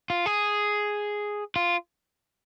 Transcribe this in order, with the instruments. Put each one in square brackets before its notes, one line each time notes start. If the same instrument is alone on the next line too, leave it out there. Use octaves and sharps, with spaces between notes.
[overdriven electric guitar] F4
G#4
F4